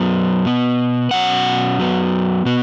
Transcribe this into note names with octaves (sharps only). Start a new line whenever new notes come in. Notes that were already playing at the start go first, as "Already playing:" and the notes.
Already playing: F#2 F#3 B3
B2 B3
B2 F#3 C#4 F#5
F#2 F#3 B3
B2 B3